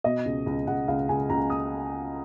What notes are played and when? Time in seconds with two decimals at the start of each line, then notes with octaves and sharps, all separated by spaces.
0.04 B2 D#5
0.26 C#2
0.46 C#2
0.67 C#2 F#5
0.88 C#2 F5
1.09 C#2 G#5
1.30 C#2 A#5
1.50 D#6